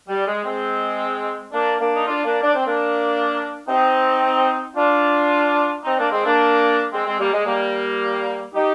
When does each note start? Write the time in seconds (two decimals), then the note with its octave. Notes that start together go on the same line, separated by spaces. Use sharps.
0.08 G3
0.26 G#3
0.44 G#3 C4
1.52 A#3 D4
1.79 A#3 D4
1.95 D#4
2.06 D4 F4
2.24 A#3 D4
2.42 D4
2.54 C4
2.66 A#3 D4
3.68 C4 D#4
4.76 D4 F4
5.84 C4 D#4
5.98 A#3 D4
6.12 G#3 C4
6.25 A#3 D4
6.93 G#3 C4
7.06 G#3 C4
7.19 G3 A#3
7.33 G#3
7.46 G3 A#3
8.54 D#4 G4